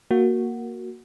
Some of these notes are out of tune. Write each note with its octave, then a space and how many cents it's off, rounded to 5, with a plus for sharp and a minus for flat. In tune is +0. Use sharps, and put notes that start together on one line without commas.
A#3 +0 F#4 +0